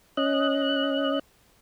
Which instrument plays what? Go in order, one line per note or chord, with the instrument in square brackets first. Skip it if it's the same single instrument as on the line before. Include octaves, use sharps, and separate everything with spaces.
[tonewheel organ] C#4 D#5 F#6